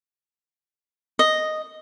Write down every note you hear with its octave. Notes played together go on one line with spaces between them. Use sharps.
D#5